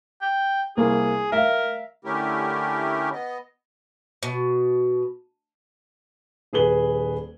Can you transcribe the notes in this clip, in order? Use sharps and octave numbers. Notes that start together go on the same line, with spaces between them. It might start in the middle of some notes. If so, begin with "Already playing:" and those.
G5
C2 A#3 G#4
A#4 E5 F5
D3 A3 C#4 E4 G4 A#4
B3 D#5
B2
D#1 G#4 B4 F#7 G7